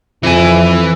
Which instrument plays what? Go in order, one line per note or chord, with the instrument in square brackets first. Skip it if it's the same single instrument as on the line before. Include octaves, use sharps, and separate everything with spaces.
[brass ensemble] F2 [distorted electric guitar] E3 G#5